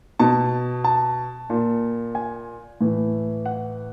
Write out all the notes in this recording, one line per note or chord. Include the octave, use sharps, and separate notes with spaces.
B2 A5
A5
A#2
G#5
A2 E3
F#5